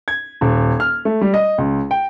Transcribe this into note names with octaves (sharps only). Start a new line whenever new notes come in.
G#6
D#1
F6
A3
G3
D#5
C#2
G5